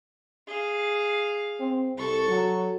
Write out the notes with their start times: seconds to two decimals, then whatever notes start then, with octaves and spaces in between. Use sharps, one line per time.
0.47 G#4 F5
1.60 C4
1.97 C2 A4 C#6
2.29 F#3